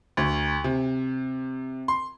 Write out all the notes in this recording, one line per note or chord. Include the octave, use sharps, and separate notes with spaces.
D2
C3
C6